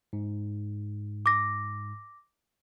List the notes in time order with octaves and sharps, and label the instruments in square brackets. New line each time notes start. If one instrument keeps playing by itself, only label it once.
[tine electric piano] G#2
[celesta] D6 A#6